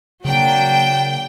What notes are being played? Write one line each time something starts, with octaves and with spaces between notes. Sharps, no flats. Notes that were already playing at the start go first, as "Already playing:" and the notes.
C#3 F#3 A#3 D4 G5